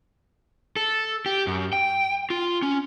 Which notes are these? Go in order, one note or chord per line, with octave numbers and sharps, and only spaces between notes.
A4
G4
F#2
G5
F4
C#4